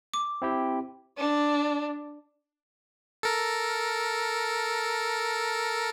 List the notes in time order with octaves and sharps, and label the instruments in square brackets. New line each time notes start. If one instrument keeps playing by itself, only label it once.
[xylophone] D6
[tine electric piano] C4 E4 G4
[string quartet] D4
[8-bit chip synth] A4 A#4